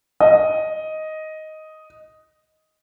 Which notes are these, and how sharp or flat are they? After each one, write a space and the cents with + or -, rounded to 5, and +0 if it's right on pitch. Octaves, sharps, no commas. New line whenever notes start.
D#5 +5